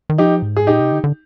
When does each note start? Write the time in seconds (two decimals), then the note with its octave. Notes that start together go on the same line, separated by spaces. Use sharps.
0.10 D#3
0.18 F3 D#4 G4
0.42 G#2
0.57 G#4
0.67 A#2 D#4 G4
0.80 C3
0.92 D3
1.04 D3